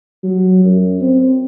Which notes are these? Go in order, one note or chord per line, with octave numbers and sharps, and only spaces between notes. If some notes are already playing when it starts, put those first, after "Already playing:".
F#3
F#2
C4